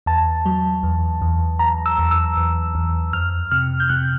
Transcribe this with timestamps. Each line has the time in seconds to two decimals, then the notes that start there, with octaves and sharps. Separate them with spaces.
0.06 E2 A5
0.46 F#3
0.83 E2
1.21 E2
1.59 E2 A#5
1.86 E6
1.98 E2
2.11 E6
2.37 E2
2.75 E2
3.13 F2 F6
3.51 C3 F6
3.80 G6
3.89 C3 F#6